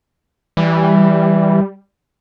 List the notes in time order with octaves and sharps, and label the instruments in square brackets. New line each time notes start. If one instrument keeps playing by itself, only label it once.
[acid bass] E3 [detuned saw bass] G3